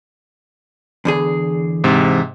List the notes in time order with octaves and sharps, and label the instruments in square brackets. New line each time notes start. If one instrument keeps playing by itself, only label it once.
[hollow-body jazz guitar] E2 D3 G#4
[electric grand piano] G#2 C3